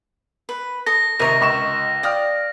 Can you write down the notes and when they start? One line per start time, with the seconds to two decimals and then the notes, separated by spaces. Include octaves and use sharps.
0.49 B4
0.86 A4 D#6 A#6
1.19 G#1 C3 A#4 C#5 D#5 D#7
1.41 C#2 C#6 E7
2.03 D5 F5 G5 D#6 F6